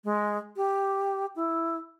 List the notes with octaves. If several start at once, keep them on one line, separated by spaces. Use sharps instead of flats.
G#3
G4
E4